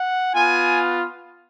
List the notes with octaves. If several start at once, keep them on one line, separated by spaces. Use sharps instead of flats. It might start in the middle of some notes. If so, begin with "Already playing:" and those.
Already playing: F#5
B3 F4 G#5